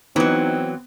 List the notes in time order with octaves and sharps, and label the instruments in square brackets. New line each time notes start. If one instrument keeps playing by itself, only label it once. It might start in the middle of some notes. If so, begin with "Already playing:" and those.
[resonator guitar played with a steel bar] E3 F#3 [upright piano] B3 [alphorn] C4 [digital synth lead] D#4